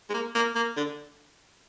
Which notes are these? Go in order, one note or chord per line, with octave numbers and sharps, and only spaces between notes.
G#3
A#3
A#3
A#3
D3